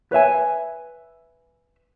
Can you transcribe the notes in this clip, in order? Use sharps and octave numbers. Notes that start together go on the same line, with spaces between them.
B4 C#5 E5 G#5